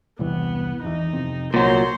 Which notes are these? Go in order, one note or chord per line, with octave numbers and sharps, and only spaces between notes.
E1 C2 E3 B3
G#1 E2 E3 D#4
F2 C3
C2 A#2 F#3 C5 C#5